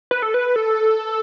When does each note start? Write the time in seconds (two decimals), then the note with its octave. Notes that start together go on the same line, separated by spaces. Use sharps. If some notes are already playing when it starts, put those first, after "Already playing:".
0.11 B4
0.22 A4
0.34 B4
0.56 A4